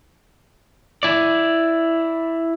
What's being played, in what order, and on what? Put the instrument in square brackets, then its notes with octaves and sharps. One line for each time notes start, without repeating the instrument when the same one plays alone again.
[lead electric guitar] E4 D5